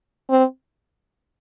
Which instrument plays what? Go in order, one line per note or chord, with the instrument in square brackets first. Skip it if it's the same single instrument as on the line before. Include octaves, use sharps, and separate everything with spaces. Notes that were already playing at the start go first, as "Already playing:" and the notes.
[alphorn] C4